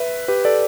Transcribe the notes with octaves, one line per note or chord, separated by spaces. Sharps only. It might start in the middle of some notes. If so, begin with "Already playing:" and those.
Already playing: B4 E5
G4 B4
A4 D5